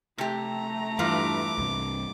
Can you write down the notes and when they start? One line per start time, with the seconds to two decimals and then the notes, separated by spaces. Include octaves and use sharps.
0.18 C3 A3 G4 A#5
0.99 E2 G2 E3 F4 D6
1.58 C2 G2 C3